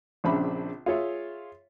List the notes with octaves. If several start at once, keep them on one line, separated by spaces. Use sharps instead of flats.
A#1 C#3 C4 D4 E5 B5
F4 G#4 C#5 E5